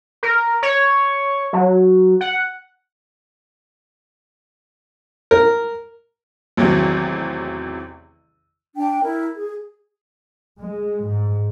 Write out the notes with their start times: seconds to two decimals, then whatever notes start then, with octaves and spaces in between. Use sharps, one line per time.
0.23 A#4
0.63 C#5
1.53 F#3
2.21 F#5
5.31 A#4
6.57 A1 E2 C3 D#3 E3 F#3
8.76 D4 G5
9.03 E4 A#4
9.35 G#4
10.61 G#3
11.05 G#2